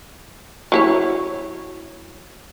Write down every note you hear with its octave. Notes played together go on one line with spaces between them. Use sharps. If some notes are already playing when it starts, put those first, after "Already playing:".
F#3 E4 C#5